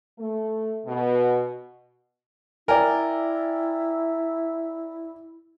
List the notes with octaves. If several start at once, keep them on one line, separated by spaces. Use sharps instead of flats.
A3
B2
E4 A#4 D5 G5 G#5